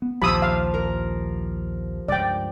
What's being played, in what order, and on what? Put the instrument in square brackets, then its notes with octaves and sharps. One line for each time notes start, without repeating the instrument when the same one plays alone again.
[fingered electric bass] B3
[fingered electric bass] A#1 D#2 [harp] F3 G4 A5 [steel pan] B5 D#6 E6
[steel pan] F5
[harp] A#4
[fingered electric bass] C#2 G2 [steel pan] D5 G5